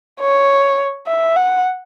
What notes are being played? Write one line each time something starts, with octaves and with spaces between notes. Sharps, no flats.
C#5
E5
F#5